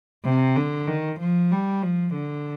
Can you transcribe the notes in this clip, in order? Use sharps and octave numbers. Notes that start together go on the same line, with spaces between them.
C3
D3
D#3
F3
G3
F3
D3